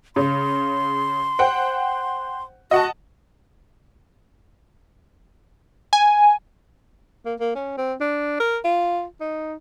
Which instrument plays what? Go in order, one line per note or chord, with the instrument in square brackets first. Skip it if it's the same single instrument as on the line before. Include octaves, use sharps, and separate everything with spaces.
[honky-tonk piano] C#3 [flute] C6
[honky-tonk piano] C5 F#5 G5
[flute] F#4 [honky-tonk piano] D#5 F#5 A5
[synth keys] G#5
[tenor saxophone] A#3
A#3
C#4
C4
D4
A#4
F4
D#4